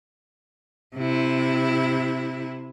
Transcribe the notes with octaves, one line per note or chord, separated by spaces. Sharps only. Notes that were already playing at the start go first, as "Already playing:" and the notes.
C3 E4